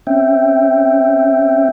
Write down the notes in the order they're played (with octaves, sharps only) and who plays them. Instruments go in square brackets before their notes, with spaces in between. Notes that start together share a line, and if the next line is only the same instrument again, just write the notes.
[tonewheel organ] C4 C#4 E5 G5